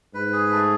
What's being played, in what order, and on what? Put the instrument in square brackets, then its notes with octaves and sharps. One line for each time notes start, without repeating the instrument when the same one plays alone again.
[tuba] G#2 [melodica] B4
[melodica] G#4
A3